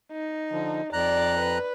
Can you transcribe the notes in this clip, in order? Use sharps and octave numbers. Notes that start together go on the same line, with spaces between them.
D#4
D3 F3
F2 D5 A#5 F#6
B4